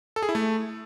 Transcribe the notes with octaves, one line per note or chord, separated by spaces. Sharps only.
A4
G#4
E4
A3